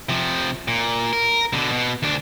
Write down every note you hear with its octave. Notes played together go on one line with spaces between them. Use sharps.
C3 F3
A#2
A#4
B2 D3
B2
D2 D4